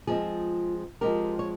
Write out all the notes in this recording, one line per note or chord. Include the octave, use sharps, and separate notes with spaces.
F3 G#3 C4 F4 G#4
F3 G#3 C4 G4 A#4
C#5